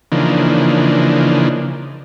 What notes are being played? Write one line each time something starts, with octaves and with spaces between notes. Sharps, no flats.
C#3 E3 F3 A#3 D4 D#4